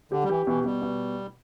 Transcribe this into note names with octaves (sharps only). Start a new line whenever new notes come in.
D3 G4
G3
E3 G4
B2 E3
B2 G3
B2